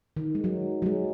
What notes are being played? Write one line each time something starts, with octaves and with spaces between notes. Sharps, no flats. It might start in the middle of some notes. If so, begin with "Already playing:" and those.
D#3
G#3
F#3
F#3
G#3